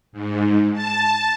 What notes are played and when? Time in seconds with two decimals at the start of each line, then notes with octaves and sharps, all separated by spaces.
0.12 G#2
0.74 A5